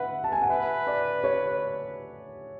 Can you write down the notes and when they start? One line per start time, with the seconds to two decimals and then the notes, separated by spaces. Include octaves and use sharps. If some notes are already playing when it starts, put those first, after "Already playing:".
Already playing: B4 E5 F#5
0.24 A5
0.32 G#5
0.41 F#5
0.49 B4 E5
0.87 D5
1.24 C#5